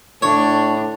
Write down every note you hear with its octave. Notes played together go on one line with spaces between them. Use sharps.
A2 D4 C#5